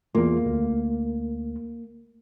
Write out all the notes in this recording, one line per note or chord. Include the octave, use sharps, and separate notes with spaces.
E2 A#3 F4
D2